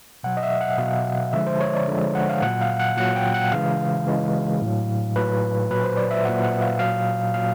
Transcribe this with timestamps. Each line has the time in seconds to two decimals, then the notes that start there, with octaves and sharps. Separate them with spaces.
0.23 B2 F#3 F#5
0.37 D#5
0.43 E5
0.61 F#5
0.78 B2 F#3 F5
1.33 D3 F3 G#3 E5
1.47 C5
1.60 C#5
1.75 D5
1.88 D3 F3 G#3
2.15 F#5
2.30 F5
2.42 A#2 F#3 F#5
2.61 F5
2.80 F#5
2.97 A#2 F#3 F#5
3.16 G5
3.34 F#5
3.52 C#3 E3 G#3 F5
4.06 C#3 E3 G#3
4.61 A2 F#3
5.16 A2 F#3 B4
5.70 A#2 F#3 B4
5.84 C5
5.97 D5
6.11 E5
6.24 A#2 F#3 F#5
6.44 F#5
6.62 F5
6.79 A#2 F#3 F5
7.34 A#2 F#3 F5